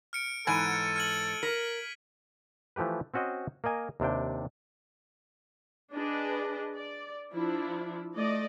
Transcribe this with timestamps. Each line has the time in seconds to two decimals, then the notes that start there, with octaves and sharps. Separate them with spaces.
0.13 F6 C#7 D7
0.47 G#2 E3 A4 G#5 G#6 D7 D#7
0.96 F6 G#6 F#7
1.43 A#4 B6
2.76 E3 F3 A3 G4 B4
3.14 C4 C#4 F#4 C5 D#5
3.64 A#3 A#4 D#5 G#5
4.00 D#2 C3 D4 G5
5.94 D4 G#4 B4 D#5
6.76 D5
7.32 F3 D4 E4
8.15 A3 D5 D#5